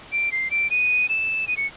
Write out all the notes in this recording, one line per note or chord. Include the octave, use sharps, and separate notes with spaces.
D7
C7
D7
D#7
E7
D#7
C#7